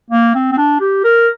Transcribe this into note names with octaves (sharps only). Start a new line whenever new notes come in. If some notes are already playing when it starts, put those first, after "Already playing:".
A#3
C4
C4
D4
G4
A#4